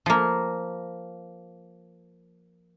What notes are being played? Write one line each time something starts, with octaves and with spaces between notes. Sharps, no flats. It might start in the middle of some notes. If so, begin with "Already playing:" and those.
F3 A#3